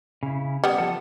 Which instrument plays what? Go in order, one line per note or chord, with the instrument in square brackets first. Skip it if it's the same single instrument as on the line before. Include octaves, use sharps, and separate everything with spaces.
[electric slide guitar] C#3 E4
[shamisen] G3 B3
[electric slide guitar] F3 A4